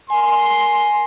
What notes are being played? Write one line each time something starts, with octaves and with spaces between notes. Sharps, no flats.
A#4 G#5 C6